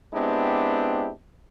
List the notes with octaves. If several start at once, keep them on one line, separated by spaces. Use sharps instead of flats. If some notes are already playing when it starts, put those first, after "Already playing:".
G#3 B3 C4 D4 E4 G4